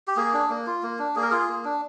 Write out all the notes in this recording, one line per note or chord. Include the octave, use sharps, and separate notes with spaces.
G4
A#3 G#4
D4
A#3
F4
A#3
D4
A#3 G#4
A#4
F4 G#4
A#3
D4